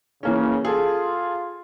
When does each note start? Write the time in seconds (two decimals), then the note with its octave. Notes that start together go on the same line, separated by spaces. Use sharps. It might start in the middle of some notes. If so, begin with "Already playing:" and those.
0.23 C#3 E3 A#3 C#4
0.65 F4 G#4 A4